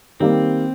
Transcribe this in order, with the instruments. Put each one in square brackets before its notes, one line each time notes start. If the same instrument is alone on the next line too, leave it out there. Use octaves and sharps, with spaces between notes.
[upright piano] D#3 G3 A#3 [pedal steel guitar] C4